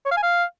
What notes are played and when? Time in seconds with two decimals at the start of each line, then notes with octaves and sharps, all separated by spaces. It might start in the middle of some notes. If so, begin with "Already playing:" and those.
0.05 C#5
0.11 F5
0.17 G#5
0.23 F5